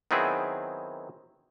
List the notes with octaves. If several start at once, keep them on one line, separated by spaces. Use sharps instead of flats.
D#3 F#3 B3 C4 E4 G#4